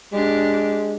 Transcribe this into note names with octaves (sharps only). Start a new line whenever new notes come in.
G#3 D4 G4